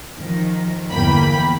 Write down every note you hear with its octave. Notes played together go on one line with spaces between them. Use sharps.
D#3 F3
G1 E2 A#3 G5 B5